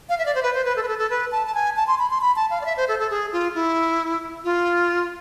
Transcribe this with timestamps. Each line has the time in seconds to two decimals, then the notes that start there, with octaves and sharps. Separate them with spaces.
0.09 F5
0.18 E5
0.26 D5
0.35 C5
0.43 B4
0.54 C5
0.65 B4
0.76 A4
0.83 B4
0.88 A4
0.98 A4
1.10 B4
1.32 A5
1.47 A5
1.54 G#5
1.76 A5
1.87 C6
1.99 B5
2.10 C6
2.21 B5
2.36 A5
2.50 F5
2.61 D5
2.65 E5
2.77 C5
2.88 A4
2.99 A4
3.10 G#4
3.32 F4
3.55 E4
4.44 F4